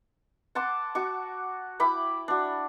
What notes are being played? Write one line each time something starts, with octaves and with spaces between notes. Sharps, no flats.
F#5 A5 C6 D6
F#4 C#6 D6
E4 G5 B5 D6
D4 F#4